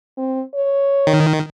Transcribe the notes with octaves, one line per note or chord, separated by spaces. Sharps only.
C4
C#5
D#3